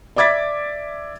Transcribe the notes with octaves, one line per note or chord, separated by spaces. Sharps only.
D5 E5 D6 G#6 A6 B6